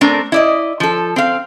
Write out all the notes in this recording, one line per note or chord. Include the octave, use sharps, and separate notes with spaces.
A3 C4 D4 A#4
E4 D5 D#5
F3 A4
C4 F5